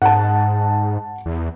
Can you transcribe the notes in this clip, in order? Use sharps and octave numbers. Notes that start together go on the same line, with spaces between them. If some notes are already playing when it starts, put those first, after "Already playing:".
G#2 F#5 A5
E2